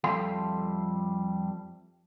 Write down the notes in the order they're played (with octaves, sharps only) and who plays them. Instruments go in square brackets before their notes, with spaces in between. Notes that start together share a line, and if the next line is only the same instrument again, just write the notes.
[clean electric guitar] F2 G3 A4 E5 F5 C6